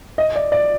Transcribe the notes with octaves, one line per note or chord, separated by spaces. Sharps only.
D#5
D5
D5